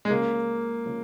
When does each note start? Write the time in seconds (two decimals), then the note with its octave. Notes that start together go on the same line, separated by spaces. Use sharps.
0.05 G#3
0.10 C#2 C#3 F3 A#3 C#4 F4
0.85 C#3 F3 C#4 F4